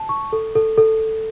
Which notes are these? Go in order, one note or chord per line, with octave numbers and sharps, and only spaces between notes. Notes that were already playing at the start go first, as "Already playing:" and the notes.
Already playing: A5
C#6
A4
A4
A4